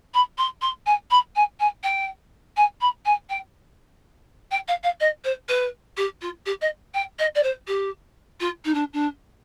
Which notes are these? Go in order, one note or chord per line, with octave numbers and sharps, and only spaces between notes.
B5
C6
C6
G#5
B5
G#5
G#5
G5
G#5
B5
G#5
G5
G5
F5
F5
D#5
C5
B4
G4
F4
G4
D#5
G5
D#5
D5
C5
G4
F4
D#4
D4
D4